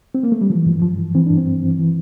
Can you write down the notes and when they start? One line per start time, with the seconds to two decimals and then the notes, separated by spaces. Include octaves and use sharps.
0.15 C4
0.23 A#3
0.32 A3
0.41 G3
0.50 E3 F3
0.66 G2 F3
0.82 G2 F3
0.98 E3
1.15 E3 C4
1.26 G2 D4
1.37 C4
1.47 G2
1.63 E3
1.79 E3